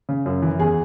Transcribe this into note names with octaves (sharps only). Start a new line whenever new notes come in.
C#3
F#2
E3
E2 G#4